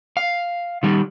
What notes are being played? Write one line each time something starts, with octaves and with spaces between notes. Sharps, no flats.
F5
D#3 G3